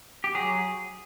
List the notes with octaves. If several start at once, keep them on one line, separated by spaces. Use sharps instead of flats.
G4
F#3 G#4